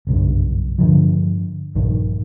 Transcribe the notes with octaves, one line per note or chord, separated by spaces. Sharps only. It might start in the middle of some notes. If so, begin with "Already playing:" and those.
F#1 B1 G2
G2 D3 F3
A#1 G2 D#3